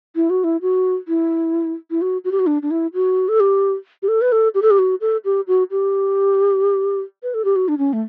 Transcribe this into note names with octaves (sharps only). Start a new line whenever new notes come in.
E4
F#4
E4
F#4
E4
E4
F#4
F#4
G4
F#4
D4
D4
E4
F#4
A4
G4
G4
A4
B4
A4
G4
A4
G4
F#4
A4
G4
F#4
G4
B4
A4
G4
F#4
D4
C#4
A3